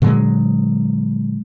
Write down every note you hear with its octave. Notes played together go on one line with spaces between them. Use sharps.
A#2 D3 F#3 G#3